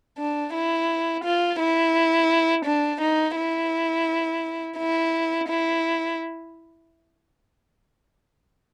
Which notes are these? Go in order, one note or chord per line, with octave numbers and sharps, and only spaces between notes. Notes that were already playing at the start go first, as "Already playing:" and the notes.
D4
E4
F4
E4
D4
D#4
E4
E4
E4